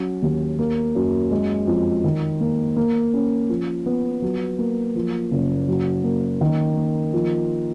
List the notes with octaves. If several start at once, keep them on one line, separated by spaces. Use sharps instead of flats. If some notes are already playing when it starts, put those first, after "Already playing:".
Already playing: F#3 C#4
D#2
A#3
F#2
G#3
F2
D#3
A#3
A#3
C#4
F3
B3
F#3
A#3
F3
F#1
F#3
A#3
D#3
A#3
F3